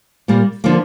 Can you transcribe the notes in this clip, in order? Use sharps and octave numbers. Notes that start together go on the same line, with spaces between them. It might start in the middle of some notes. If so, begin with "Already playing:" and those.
A#2 G3 A#3
D3 F3 A#3